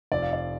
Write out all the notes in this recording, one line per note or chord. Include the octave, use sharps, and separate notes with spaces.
F1 F2 F3 D5
F5
D5